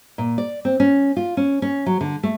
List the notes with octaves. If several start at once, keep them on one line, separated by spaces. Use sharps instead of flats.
A#2
D5
C4
C#4
F4
C#4
C#4
F#3
D3
A3